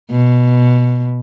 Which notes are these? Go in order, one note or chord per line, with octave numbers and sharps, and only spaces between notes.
B2